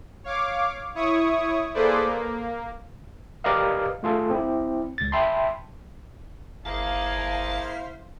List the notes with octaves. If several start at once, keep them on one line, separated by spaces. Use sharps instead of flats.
C#5 F5 D6
E4 C#5 C#6 D#6
A#3 G#4 A4 B4 C5 D5
A#3
G4 A#4 B4 D5 D#5 F5
A3 F4 G#4 A4
C4 E4
C#2 A6
E5 G5 A5 B5 C6
G1 A#3 E4 G#4 C5 F5 A5